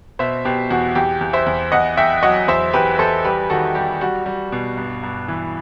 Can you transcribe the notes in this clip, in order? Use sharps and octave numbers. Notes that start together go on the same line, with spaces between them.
B2 C5 E5
B2 G4
E2 F#4
E2 G4
E2
C5 E5
E2
E2 D#5 F#5
E2 E5 G5
F#3 D#5 F#5
E2 C5 E5
E2 G4 B4
E2 A4 C5
G3 G4 B4
D#3 F#4 A4
G3 G4
G3 F#4
G3
B2
G2
G2
E3